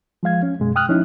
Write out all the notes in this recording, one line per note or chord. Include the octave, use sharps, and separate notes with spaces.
F3 G#3 F5 G#6
C#4
F#2 B2 G#3
G5 D#6 F6 F#6
F3 C#4 D#4 E4